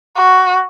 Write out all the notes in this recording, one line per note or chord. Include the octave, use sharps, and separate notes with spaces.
F#4